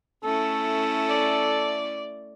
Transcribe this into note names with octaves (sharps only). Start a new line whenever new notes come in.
A3 C#4 E4 A4
D5